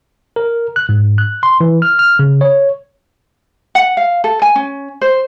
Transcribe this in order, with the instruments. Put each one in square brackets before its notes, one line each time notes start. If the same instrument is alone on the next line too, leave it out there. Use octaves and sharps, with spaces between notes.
[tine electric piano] A#4
F#6
G#2
F#6
C6
E3
F6
F6
C#3
C#5
[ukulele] F#5
F5
A4
G#5
C#4
C5